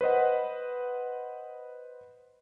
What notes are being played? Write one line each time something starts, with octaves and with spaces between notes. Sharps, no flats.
B4 C5 D#5 F#5